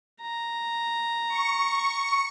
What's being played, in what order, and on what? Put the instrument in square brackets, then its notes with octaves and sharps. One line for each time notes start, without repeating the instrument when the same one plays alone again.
[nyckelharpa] A#5
[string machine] C#6